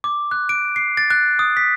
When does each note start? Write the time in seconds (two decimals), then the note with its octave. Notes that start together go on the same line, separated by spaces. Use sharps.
0.04 D6
0.31 F#6
0.49 D7
0.76 C7
0.97 A6
1.10 F#6
1.39 D#6
1.57 B6